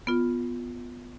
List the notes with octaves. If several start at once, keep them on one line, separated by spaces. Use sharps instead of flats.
B3 F4